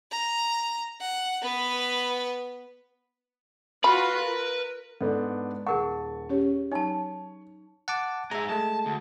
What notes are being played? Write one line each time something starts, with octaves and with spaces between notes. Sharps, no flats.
A#5
F#5
B3 B4
F4 F#4 B4 B5
A#4
G#2 B3 D4 A4
D#1 G#4 A#4 F#5 A5 C#6
C#4 G4 C#5
F#3 D#4 C#5 G#5 A5
F#5 A5 D6
G#2 G#4 E5 A#5
G#3 A3 A5
D2